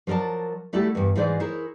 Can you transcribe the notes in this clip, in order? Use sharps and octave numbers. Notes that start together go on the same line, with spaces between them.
F3 F#3 A#4 D5 A5
G3 A3 E4 F#4 G4 A4
E2 G2
G#2 E3 D#4 G#4 C5 D5
E4 G#4 A#4 C5 C#5